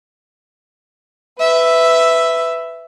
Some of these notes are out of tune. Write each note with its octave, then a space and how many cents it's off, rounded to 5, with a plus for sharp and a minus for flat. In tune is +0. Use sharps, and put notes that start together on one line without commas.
B4 +15 E5 +0